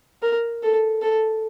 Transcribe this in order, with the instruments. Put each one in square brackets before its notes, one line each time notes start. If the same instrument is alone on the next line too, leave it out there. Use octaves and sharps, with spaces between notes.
[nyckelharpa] A#4
A4
A4